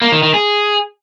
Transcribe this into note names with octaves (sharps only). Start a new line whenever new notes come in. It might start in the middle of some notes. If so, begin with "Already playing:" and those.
A#3
D#3
D#3
G#4